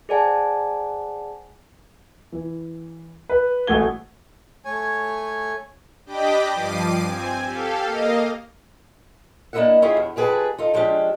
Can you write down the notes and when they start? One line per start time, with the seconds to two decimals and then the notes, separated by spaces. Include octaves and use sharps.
0.09 G#4 C5 D5 F#5 G#5 A5
2.32 E3
3.29 B4
3.67 A1 G#3 A3 F#4 G#6 G7
4.65 A3 C#5 G#5
6.06 D4 G4 D#5 G5 B5 D6
6.52 G2 F3 D6 C7 D#7
7.03 C4 G#5
7.45 G4 A4 F5
7.85 A#3 D#5 F5
9.53 A#3 D4 E4 D#5 E5 F#5
9.82 C#4 E4 F4 G4 G#4 D#5
9.97 E2
10.16 F2 G4 G#4 B4 F#5 A5
10.58 D#4 F4 A4
10.74 F3 G#3 C#4 D4 G4